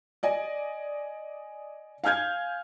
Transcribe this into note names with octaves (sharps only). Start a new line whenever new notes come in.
D5 D#5 G#5
F5 G#5 F6 G6 G#6